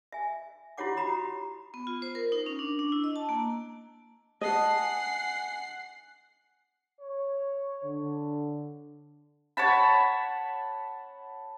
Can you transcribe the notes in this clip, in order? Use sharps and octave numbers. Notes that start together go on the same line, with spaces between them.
E5 G#5
E4 F4 G4 C#5 F#5 D6
F#4 G4 A#5 B5 D#6
B3
F4
C5
A#4
D#4
C#4
D4
D4
E4
D#5
A5
A#3
D#5 F#5 A5 C7
G#5
C#5
D3
C#5 F#5 A5 B5